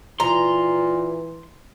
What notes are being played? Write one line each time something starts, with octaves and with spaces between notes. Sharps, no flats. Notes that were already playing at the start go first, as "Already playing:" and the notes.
A#2 E3 A#5 C6